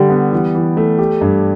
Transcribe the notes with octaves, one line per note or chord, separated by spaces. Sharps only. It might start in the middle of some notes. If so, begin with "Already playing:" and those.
Already playing: D3 G3 G4
B3
E3
E3
A3
G4
G2